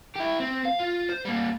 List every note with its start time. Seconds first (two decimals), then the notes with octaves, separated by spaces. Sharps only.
0.16 E4 G4
0.40 C4
0.66 F5
0.80 F4
1.10 C5
1.25 G3 A#3